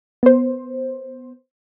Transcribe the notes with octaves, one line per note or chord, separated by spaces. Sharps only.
B3 C5